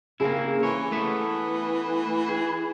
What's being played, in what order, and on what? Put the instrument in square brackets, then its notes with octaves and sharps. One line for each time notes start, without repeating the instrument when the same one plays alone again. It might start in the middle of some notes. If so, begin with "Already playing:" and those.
[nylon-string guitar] C#3 G#4 [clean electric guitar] A#3 C4 E4
[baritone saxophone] E3 [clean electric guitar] C#5 [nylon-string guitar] G#5
[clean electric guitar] A3 B3 E5
G#4